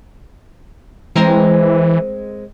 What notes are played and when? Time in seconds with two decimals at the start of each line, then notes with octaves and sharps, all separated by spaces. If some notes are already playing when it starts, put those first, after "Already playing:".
1.16 E3 G#3 C4 A#4